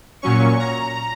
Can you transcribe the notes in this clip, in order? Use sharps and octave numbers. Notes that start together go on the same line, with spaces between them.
A#2 F#3 C#4 C#6
A#5